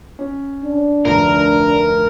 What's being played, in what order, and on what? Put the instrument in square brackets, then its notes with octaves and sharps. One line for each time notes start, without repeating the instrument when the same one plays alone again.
[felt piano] C#4
[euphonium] D4
[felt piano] F1 D2 [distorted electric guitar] A#4